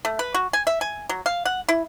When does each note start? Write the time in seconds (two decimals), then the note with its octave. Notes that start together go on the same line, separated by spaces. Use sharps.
0.05 A3
0.19 B4
0.34 F#4
0.53 G#5
0.67 E5
0.81 G#5
1.09 F#3
1.26 F5
1.45 F#5
1.69 E4